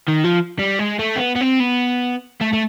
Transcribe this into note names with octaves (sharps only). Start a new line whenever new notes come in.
D#3
F3
G3
G#3
A3
C4
B3
B3
C4
B3
A3
A3